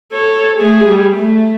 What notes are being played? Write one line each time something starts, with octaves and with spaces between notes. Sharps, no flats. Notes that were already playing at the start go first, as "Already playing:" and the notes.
A4 C#5
A3 G#4
G3
A3